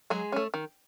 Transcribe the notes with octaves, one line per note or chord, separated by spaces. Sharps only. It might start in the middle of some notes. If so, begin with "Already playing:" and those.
F#3 G#3 G#4
A3 C#4
D#3